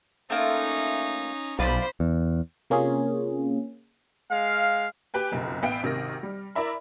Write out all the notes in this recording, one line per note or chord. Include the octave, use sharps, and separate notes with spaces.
A3 A#3 C#4 D#4 F4
B1 F4 B4 C5 D5 B5
E2
C3 A#3 C#4 F4 G#4
G#3 F5
G4 B4 G5 G#5
F#1 B1 F2
A1 B3 E5 F5 G5 D7
G#1 C3 D#3 F6 A#6
G3
E4 A#4 D5 E5 B5